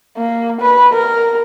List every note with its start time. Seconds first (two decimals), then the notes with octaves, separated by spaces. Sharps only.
0.17 A#3
0.61 B4
0.93 A#4